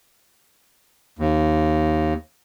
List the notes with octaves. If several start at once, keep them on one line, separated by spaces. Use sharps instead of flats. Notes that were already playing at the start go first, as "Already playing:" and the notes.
D#2